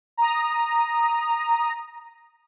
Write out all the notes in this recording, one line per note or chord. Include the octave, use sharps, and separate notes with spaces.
A#5 D#6